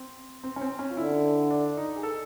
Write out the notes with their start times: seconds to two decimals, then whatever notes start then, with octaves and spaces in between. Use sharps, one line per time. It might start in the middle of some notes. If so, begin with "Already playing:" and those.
Already playing: C4
0.44 C4
0.56 C#4
0.61 C4
0.79 C#4
0.90 F4
0.97 D3 E4
1.51 D4
1.77 D#4
1.96 G#4
2.03 A4